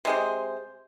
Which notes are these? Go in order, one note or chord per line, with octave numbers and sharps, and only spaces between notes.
C3 G#3 C5